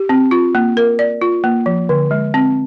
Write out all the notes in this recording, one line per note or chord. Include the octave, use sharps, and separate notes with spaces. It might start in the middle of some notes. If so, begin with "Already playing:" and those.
Already playing: G4
C4
F4
A#3
A#4
D5
F4
A#3
F3
D3
G#3
C4